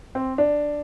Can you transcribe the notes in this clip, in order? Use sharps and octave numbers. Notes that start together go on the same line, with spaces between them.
C4
D4